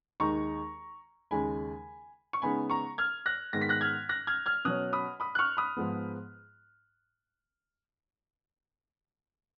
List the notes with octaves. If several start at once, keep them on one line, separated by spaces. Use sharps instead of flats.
D#2 D#3 G#3 D#4 A#5 C#6
D#2 C#3 G#3 D#4 G#5 B5
C#6
C#3 G#3 B3 D#4 G#5 B5
A#5 C#6
F6 G#6
F#6 A#6
G#2 D#3 G#3 B3 A#6
B6
F#6 A#6
F6 G#6
F#6 A#6
F6 G#6
F6 G#6
B2 F#3 C#4 D#6 F#6
B5 D#6
B5 D#6
F#6
C#6 F6
B5 D#6
G#2 F3 G#3 B3